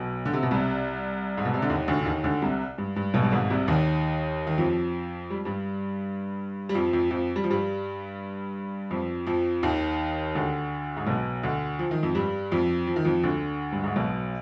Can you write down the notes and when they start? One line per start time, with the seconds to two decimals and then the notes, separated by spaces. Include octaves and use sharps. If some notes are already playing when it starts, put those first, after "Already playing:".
Already playing: B1 B2
0.25 D3
0.33 C3
0.43 B2
0.51 C2 C3
1.37 G#2
1.45 B2
1.54 C3
1.62 D3
1.70 D#2 D#3
1.88 D2 D3
2.00 D3
2.06 D#2 D#3
2.24 D2 D3
2.42 C2 C3
2.78 G2
2.96 G2
3.14 B1 B2
3.23 G2
3.32 G#1 G#2
3.50 C2 C3
3.68 D#2 D#3
4.47 D#3
4.58 F2 F3
5.30 G3
5.45 G2 G3
6.69 G3
6.74 F2 F3
6.93 F2 F3
7.11 F2 F3
7.36 G3
7.44 F3
7.50 G2 G3
8.91 F2 F3
9.26 F2 F3
9.63 D#2 D#3
10.35 D2 D3
10.97 G#2
11.07 B1 B2
11.43 D2 D3
11.79 F3
11.91 D#3
12.03 F2 F3
12.15 G2 G3
12.51 F2 F3
12.87 F3
12.96 D#3
13.05 F2 F3
13.23 D2 D3
13.72 G2
13.84 G#2
13.96 B1 B2